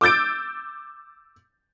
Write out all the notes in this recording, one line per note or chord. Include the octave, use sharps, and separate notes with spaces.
D6 E6 G6 A6 D7